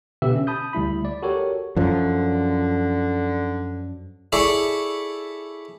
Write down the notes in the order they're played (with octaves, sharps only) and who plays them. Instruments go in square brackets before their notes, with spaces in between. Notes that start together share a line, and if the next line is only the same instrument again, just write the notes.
[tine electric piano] B2 D3 G4 B4 E5 E6
C#4
A5 B5 D#6 G6
D2 G3 E4 B5
D5
F#4 G4 A4 A#4 C#5
[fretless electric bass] F#2 F3 [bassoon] D3
[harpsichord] E4 G#4 A4 C#5 D5